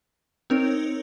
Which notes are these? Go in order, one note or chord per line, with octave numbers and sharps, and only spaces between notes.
C4 D#4 A#4 C#5